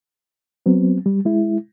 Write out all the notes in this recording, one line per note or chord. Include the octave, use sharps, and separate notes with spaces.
F#3 B3 C4
G3
G#3 E4